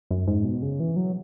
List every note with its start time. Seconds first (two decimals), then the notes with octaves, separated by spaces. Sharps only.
0.11 F#2
0.27 G#2
0.44 B2
0.62 C#3
0.80 E3
0.96 F#3